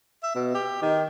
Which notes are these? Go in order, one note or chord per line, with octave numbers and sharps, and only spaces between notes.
E5
B2
G4
D#3